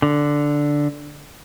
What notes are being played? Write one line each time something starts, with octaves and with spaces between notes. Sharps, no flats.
D3